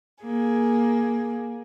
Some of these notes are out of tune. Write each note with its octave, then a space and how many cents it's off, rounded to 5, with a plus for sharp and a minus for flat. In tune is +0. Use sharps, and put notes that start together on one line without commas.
A#3 +15 G#4 +5